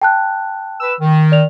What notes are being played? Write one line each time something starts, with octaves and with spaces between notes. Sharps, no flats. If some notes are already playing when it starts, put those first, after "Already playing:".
G5 A5 F#6
B4 E6
D#3
D5 F7